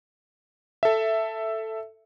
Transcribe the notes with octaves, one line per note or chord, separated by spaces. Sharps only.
A4 E5